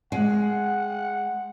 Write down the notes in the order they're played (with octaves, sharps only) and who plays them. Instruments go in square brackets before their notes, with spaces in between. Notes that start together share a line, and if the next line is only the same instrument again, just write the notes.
[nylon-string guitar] G#3 [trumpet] F#5